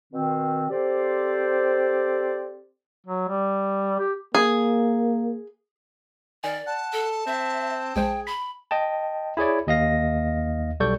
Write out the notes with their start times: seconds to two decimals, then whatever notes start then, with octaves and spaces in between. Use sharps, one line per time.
0.12 B2 D#3 C4
0.70 C4 G4 A4 C5 D5
3.06 F#3
3.29 G3
3.99 G4
4.35 A#3 G#4
6.44 D#3 D5 G#5
6.67 F#5 A5
6.93 A4
7.27 C4 E5
7.96 A#1 G#3 G#4 C5 G5
8.27 B5 B6
8.71 D#5 G5 A5
9.37 E4 G#4 C#5 D5
9.67 D#2 D#5 F5 A#6
10.80 B1 G3 A4 D5 C#6 G6